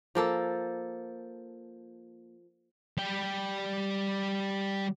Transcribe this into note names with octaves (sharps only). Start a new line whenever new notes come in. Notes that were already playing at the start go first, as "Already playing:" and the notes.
F3 A#3 A4
G3 G5